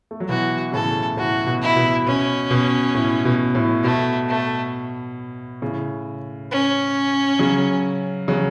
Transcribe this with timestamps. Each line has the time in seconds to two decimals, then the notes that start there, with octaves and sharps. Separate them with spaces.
0.11 A3
0.20 F#3
0.29 B2 E3 F#4
0.72 A2 C#3 A4
1.17 A2 F#4
1.46 B2
1.61 E4
1.76 B2
2.06 B2 C#4
2.50 B2
2.95 A2
3.25 B2
3.55 A2
3.83 B2 A3
4.29 A3
5.62 A2 C#3
6.51 C#4
7.39 C#3 F#3
8.28 C#3 F#3